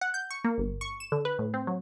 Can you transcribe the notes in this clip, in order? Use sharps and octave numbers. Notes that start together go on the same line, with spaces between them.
F#5
G6
C#6
A#3
G1
C#6
E7
D3
B4
A2
C4
F#3